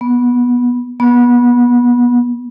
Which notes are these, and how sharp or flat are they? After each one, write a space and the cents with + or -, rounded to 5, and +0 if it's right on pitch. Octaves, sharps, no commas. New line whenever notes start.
B3 -15
B3 -25